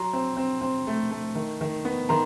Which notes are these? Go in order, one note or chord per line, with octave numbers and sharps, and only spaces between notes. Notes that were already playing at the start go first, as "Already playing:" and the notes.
Already playing: F#3 A#5 C6
C4
C4
C4
A3
A3
D#3
D#3
B3
D#3 A#5 C6